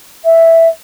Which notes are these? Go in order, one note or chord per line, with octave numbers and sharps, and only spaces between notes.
E5